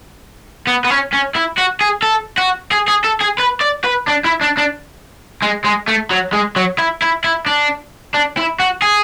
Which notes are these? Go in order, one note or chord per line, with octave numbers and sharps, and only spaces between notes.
B3
B3
C#4
C#4
E4
F#4
G#4
A4
F#4
G#4
G#4
A4
G#4
B4
D5
B4
D4
E4
D4
D4
G#3
G#3
A3
F#3
G#3
F#3
E4
E4
E4
D4
D4
E4
F#4
G#4